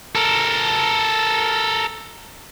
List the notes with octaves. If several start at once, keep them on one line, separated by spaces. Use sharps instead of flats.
A4 A#4